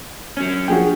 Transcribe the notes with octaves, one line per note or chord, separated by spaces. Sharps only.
F#3 C#4
A#1 F#4 G#4 G5